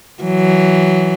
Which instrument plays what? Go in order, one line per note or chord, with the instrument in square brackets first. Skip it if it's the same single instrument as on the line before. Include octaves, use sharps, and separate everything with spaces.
[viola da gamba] E3 F#3